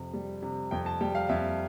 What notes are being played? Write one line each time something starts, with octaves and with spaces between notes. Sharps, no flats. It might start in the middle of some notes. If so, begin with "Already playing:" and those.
Already playing: F2 C3
G3
C3
F2 G5
A5
G3 G5
F5
F2 E5